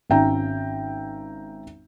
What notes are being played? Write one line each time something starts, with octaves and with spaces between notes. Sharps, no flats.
G#1 C#4 E5 G5 A#5